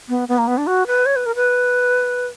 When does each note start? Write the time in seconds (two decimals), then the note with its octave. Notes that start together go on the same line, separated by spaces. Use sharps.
0.09 B3
0.28 B3
0.38 A#3
0.47 B3
0.58 D4
0.67 F#4
0.87 B4
1.06 C#5
1.16 B4
1.26 A#4
1.35 B4